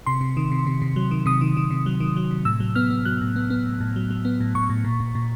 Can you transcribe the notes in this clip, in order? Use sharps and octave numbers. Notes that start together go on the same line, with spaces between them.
C3 C6
C3
D#3
C3
C3
C3
F#3
D#3
C3 D#6
D#3
D#3
C3
F#3
D#3
F#3
C3
A2 E6
F#3
B3 F6
B3
F#3 F#6
A2
B3
B3
A2
A2
F#3
F#3
B3
A2
A2 C#6
A2
A#2
A#2
A#2